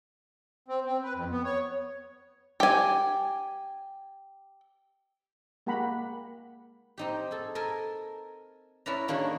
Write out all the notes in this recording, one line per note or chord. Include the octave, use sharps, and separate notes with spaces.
C4
C4
B4
F2
B3
C#5
G4 G#5
G#3 A#3 G4 F#5 A#5 B5
C4 D#4 G4
G#4 A4
A4 A#4 G#5
C#4 E4 A#4 B4 D5 A#5
D#3 A#3 C#4 D4 F#4 G#4